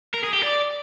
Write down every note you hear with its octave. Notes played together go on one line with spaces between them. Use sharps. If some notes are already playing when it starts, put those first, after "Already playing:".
A#4
G#4
G4
D5